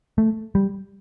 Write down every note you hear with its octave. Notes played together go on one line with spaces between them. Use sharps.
A3
G3